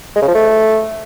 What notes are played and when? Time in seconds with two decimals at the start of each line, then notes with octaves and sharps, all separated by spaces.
0.16 G#3
0.22 C#3
0.28 F3
0.34 A3